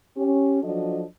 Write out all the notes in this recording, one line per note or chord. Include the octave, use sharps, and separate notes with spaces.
C#4 G4
F3 F#3 D4 F#4 A4 D#5